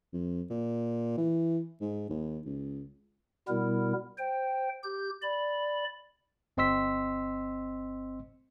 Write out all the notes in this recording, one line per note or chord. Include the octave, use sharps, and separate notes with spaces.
F2
A#2
E3
G#2
D#2
C#2
B2 G3 B3 E4 A#4
C5 G5
G4 G6
D5 B5
G1 C4 D#5 C6 E6 B6